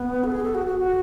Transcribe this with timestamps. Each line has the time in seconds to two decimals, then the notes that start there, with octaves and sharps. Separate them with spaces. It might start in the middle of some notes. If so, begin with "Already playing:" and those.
Already playing: B3
0.24 A4
0.32 G#4
0.43 A4
0.55 F#4
0.66 F#4
0.78 F#4